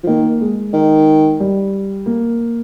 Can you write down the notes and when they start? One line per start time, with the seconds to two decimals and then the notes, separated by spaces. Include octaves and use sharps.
0.03 F3
0.07 D#3 A#3
0.41 G#3
0.73 D#3
1.40 G3
2.06 A#3